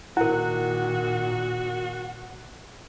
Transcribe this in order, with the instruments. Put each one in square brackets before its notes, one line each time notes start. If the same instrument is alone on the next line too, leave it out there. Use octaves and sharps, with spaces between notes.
[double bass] A#2 D#3 [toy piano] E4 A#4 [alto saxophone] F#4 [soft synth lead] F#5